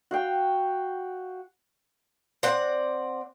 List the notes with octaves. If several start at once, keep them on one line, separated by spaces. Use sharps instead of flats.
F#4 F5 G5
C4 D5 F#5